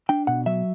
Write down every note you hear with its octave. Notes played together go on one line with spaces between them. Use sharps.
D4 G5
B2 F#5
F#3 E5